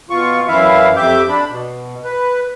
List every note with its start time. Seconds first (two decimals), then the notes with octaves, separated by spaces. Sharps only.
0.10 B2 F4 C#6
0.48 F#2 E3 E4 E5 F5
0.97 F2 G4 E5 D6 G6
1.29 D4 B5
1.49 B2
2.04 B4